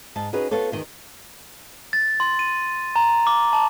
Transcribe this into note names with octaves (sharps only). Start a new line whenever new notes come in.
G#2 D#5 A5
C#4 D#4 F#4 G#4 B4 C#5
B3 F4 A4 C#5
E2 D#3 D#4
A6
C6
D#7
A#5
D6
A5